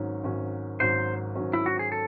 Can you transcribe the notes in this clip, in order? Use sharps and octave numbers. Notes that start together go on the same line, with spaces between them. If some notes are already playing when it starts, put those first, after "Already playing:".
Already playing: G#1 G#2 F#3 C#4
G#1 G#2 F#3 C#4
G#1 G#2 F#3 C#4 C5
G#1 G#2 F#3 C#4
E4
F#4
G#4
A4